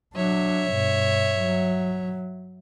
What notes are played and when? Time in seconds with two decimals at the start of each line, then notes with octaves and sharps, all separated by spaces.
0.16 F#3 D4 C#5 E5
0.71 G2 B2
1.40 F#3